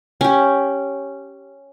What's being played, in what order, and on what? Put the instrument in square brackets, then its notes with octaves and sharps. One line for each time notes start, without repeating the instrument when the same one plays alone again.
[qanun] C#4 G4